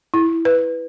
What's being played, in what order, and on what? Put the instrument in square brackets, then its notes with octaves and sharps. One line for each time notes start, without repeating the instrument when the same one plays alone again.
[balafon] E4
B4